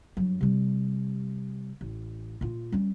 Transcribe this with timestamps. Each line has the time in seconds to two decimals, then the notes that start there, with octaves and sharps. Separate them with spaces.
0.17 G2 F#3
0.41 C3 G3
1.81 A1
2.41 A#2 F4
2.72 G3 C#4